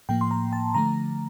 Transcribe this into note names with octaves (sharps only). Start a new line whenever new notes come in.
A2 F3 A#3 G5
C6
A#5
A5
D3 F3 A3 A#5